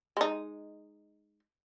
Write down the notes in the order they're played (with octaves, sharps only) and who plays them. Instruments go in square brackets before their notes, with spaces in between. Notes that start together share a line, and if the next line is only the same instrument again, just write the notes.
[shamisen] G#3 D#4